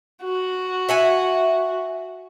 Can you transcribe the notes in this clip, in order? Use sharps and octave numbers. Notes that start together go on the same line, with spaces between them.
F#4
E5 F#5 G#5